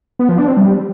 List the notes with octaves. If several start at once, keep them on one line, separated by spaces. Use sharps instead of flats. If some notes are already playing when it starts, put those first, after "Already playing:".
B3
F3
D4
C4
G3